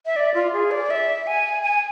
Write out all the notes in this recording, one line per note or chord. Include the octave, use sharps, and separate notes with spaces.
E5
D5
F4
G#4
D5
E5
G#5
G#5